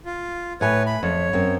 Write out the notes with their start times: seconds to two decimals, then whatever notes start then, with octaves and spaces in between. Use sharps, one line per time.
0.05 F4
0.61 A2 B4 C#5 G#5
0.86 B5
1.03 F2 C#5
1.33 F#2 C4